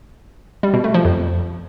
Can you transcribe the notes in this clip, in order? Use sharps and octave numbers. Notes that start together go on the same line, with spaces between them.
G3
B2
A3
F3
F2